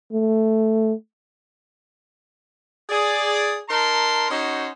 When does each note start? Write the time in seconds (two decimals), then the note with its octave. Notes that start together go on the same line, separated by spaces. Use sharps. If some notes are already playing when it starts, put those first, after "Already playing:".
0.13 A3
2.89 G#4 D5
3.69 D#4 A#4 A5 C6
4.30 C#4 D#4 F#4 C5